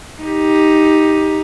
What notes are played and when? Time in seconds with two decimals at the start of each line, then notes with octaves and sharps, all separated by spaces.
0.22 D#4 G4